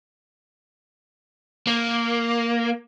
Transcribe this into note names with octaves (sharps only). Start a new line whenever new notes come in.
A#3